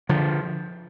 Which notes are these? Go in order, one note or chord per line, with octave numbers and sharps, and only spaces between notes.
D3 F3